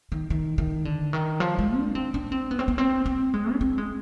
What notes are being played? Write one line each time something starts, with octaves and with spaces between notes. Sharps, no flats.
D#3
D#3
D#3
D3
D#3
F3
G#3
D4
C4
D4
C4
B3
C4
B3
C4
C4
G#3
D4
C4
G#3